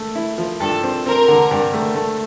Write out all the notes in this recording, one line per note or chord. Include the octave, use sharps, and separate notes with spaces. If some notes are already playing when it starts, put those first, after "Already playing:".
Already playing: A3
E4
F3
G2 A4
C4
C4 A#4
D3
G2
A3
A3